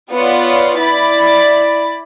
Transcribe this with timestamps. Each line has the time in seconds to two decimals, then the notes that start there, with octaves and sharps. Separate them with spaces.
0.12 B3 F4 B4 C#5 D5 F#5
0.79 E4 D5 B5 A6